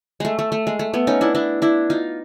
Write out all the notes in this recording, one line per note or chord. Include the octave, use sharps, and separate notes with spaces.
G#3 A3
A3
A3
G#3
A3
A3 B3
C#4 D#4
D4 E4
D4 E4
D4 E4
D#4 F4